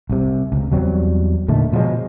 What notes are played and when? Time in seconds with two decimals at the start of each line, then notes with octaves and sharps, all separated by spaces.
0.10 C2 C3
0.52 C#2
0.72 E2 F#3 G3 C4
1.48 A#2 D3 D#3 A3
1.73 B2 F3 F#3 G#3